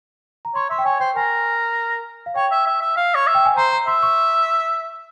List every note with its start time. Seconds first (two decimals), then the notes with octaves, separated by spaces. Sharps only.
0.45 A#5
0.55 C#5 C6
0.70 E5 C6
0.78 G5
0.85 C#5 G#5
1.00 C5 G5
1.16 A#4 G#5
2.26 F5
2.36 C#5 G5
2.51 E5
2.67 E5
2.81 E5
2.96 F5
3.15 C#5
3.27 E5
3.35 G5
3.45 G#5
3.57 C5 A#5
3.72 A#5
3.87 E5 C6
4.03 C#6